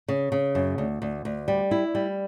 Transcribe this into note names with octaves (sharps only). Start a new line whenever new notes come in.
C#3
C#3
F#2
D2
D2
D2
G3
E4
G3